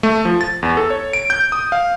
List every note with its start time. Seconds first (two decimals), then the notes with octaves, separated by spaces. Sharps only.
0.03 A3
0.25 F3
0.41 A6
0.63 E2
0.77 A4
0.90 C#5
1.13 D7
1.30 G6
1.52 D#6
1.72 F5